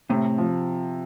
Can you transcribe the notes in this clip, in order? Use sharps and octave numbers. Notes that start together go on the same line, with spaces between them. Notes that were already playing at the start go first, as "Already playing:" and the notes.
A2 C3
F3